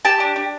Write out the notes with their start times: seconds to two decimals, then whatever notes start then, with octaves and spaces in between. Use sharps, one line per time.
0.05 G4 A5
0.20 D4
0.36 D4